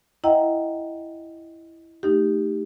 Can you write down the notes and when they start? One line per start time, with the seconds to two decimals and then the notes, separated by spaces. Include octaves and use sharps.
0.24 E4 D#5 E5 F#5 G5 A#5
2.03 A3 D#4 G4